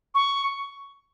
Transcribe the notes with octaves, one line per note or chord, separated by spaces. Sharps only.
C#6